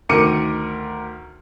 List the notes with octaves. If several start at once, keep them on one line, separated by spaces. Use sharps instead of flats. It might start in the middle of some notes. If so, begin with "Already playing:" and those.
D2 D#3 A#4 D6 C#7 D#7